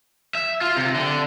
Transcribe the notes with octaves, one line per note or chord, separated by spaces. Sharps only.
E5
F4
C3
D3